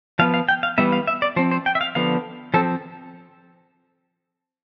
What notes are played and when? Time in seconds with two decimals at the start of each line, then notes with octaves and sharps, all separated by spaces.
0.19 F3 B3 F5
0.34 F5
0.49 G5
0.63 F5
0.78 E3 G3 B3 E5
0.92 F5
1.07 E5
1.22 D5
1.36 F3 C4 C5
1.51 C5
1.66 G5
1.75 E5
1.81 F5
1.95 D3 F3 B3 F5
2.54 F3 C4 A4